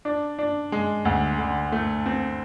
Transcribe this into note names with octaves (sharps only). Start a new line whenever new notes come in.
D4
D4
G#3
D2
D3
A3
C4